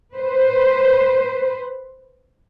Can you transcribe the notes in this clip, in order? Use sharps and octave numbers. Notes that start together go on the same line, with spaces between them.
B4 C5